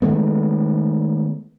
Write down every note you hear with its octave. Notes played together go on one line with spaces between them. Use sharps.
D#3 G#3 A3 B3